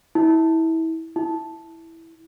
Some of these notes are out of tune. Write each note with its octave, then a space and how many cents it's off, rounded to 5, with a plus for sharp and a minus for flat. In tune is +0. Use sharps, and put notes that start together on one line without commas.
E4 -25
E4 -5